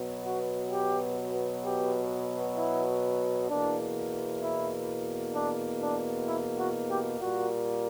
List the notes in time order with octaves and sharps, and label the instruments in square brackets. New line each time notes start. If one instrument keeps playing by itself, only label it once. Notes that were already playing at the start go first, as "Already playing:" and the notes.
Already playing: [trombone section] B2 F#3 B3
F#4
G4
G4
E4
E2 B2 A#3 D4
E4
D4
D4
E4
F#4
G4
A#2 G3 A#3 F#4